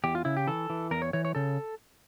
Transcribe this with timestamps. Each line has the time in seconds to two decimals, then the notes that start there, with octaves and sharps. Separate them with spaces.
0.04 E2 G4
0.15 F4
0.25 C#3 E4
0.37 G4
0.47 E3 A4
0.70 E3
0.91 E2 A#4
1.02 C#5
1.13 E3 C#5
1.25 C#5
1.35 C#3 A4